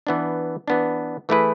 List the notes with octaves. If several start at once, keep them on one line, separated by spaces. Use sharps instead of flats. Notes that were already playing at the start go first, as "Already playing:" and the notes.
E3 B3 D4
E3 B3 D4
E3 A3 E4 G#4 B4